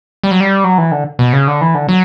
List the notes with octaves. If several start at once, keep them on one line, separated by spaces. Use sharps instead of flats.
G3
F#3
G3
F#3
E3
D3
B2
C#3
D3
E3
D3
F#3